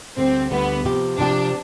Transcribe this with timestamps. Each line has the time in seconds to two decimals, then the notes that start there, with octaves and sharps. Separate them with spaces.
0.17 D2 D3 G3 C4
0.51 D2 D3 G3 B3
0.85 C3 F3 C4 G4
1.18 C3 F3 C4 D4 G4